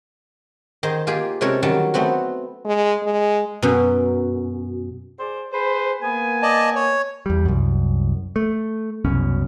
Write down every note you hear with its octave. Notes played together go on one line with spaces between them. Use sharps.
D#3 D#4 G#4 C5
A#3 F4 G4 G#4
C3 G#3 C#4 A4 A#4 C#5
D#3 F#3 G3 C#4 A5
A3 B3 C4 F#4
G#3
G#3
F#2 B2
G#4 C5 D5
G#4 B4 C5
A#3 B3 G#5
D5 D#5 A5
C#5
E2 G3
C2 F#2
A3
C2 F#2 B2 C#4